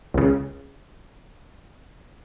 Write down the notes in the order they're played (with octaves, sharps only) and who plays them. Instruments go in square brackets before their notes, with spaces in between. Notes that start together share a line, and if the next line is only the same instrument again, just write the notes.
[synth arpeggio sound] C#2 C#3